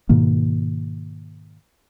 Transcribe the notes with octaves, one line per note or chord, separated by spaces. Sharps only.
G#2 B2 D#3 A#3